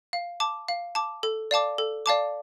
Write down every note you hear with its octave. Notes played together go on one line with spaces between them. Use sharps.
F5
A5 D6
F5
A5 D6
A4
D5 F5 A5 D6
A4
D5 F5 A5 D6